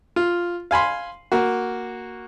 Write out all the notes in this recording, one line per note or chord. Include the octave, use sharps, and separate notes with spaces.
F4
F5 G#5 B5 C6
A#3 F#4